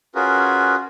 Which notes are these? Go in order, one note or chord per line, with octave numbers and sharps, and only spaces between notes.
C#4 F4 F#4 G#4 A#4 B4